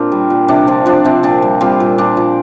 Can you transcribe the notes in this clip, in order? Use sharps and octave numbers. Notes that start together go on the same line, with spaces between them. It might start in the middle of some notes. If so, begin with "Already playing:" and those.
Already playing: A#2 C4 D4 F4 A#4
G3
A#2
C3 D4
F3 C4
F3 D4
C3 C4
A#2 D4
G3
G3 C4 F4
A#2
A#2 D4
F3